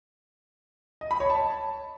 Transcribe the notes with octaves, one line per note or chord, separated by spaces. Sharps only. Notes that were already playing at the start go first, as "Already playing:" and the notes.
D#5
B5
C#5
A5